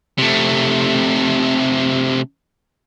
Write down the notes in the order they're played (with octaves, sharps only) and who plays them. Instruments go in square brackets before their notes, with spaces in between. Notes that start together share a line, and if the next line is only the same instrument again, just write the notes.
[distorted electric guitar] C3 A3